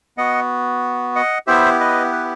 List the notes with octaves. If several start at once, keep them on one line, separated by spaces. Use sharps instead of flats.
B3 F#4 D#5 F#5
D#5 F#5
B3 E4 G4 C5 E5
B4 D#5
B4